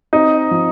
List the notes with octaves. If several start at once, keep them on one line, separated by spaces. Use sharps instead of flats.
C4 D#4
F3